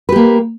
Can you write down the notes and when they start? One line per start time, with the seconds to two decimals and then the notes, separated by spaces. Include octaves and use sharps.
0.09 B4
0.12 G4
0.16 A#3